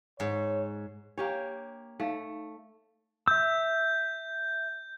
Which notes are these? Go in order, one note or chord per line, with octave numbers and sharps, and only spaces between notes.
G#2 C#5
A#3 D4 G4 C#5
A3 D#4 C#5 F5
E5 E6 G6